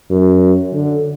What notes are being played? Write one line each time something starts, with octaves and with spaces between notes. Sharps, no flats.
F#2
D3